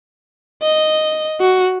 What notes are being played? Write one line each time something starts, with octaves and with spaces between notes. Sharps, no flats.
D#5
F#4